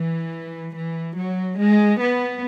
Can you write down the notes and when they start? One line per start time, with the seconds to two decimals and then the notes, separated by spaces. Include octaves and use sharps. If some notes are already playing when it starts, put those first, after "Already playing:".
Already playing: E3
0.74 E3
1.16 F#3
1.58 G#3
1.99 B3